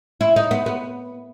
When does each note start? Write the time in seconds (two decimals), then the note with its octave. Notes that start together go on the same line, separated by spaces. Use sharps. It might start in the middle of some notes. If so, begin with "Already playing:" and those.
0.21 E4
0.36 D#4
0.51 B3
0.66 B3